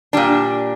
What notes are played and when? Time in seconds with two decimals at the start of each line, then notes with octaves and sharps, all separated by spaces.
0.13 A#2 G3 D4